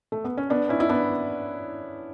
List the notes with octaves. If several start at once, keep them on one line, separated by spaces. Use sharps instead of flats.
A3
B3
C#4
B3 D4
C#4 E4
E4
B3 D4